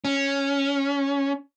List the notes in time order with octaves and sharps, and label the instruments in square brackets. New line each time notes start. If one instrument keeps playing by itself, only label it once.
[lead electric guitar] C#4